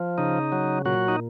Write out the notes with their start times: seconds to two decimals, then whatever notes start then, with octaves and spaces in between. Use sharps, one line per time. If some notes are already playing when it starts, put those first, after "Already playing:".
Already playing: F3
0.18 C#3 D#4
0.52 F#3
0.85 A#2 F#3 F#4
1.08 D#4